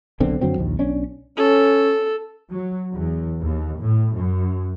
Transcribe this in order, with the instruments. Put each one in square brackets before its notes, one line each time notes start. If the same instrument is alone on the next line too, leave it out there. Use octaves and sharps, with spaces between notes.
[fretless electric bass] B1 D3 C4
F#2 D3 F#3 C4
A#1 D#2
B1 C#4 D4
[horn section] C#4 [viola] A4
[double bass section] F#3
E2
D#2
A2
F#2